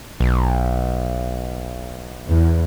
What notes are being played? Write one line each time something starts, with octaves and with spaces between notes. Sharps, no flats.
B1
E2